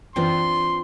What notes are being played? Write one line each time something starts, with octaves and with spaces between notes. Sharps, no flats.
F#2 E3 C4 D4 F4 C6